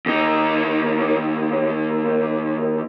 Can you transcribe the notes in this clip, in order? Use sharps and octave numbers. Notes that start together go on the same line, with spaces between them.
D#2 D#4